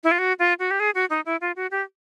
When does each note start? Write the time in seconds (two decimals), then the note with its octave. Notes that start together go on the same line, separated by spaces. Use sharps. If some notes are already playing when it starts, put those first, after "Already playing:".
0.04 E4
0.11 F4
0.19 F#4
0.39 F4
0.59 F#4
0.71 G4
0.80 G#4
0.95 F#4
1.10 D#4
1.26 E4
1.41 F4
1.56 F#4
1.71 G4